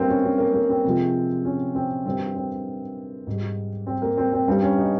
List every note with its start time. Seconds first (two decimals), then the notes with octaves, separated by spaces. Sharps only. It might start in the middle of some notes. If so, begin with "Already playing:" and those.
Already playing: G2 D#3 G3 A#3 C4
0.09 C#4
0.24 C#4
0.38 A#3
0.54 A#3
0.69 C4
0.85 C3 F3 G#3
1.45 C#4
1.75 C4
2.05 G2 D#3 G3 C4
2.36 C4
3.27 G#2 G3
3.87 C4
4.02 A#3
4.17 C4
4.33 C4
4.48 G2 G3 C4
4.62 C#4
4.78 D#4